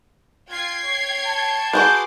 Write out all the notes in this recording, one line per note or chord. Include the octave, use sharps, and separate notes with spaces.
F4 G5 G#6 C7
C#5
A5
F#4 G#4 B4 C6 D6 G6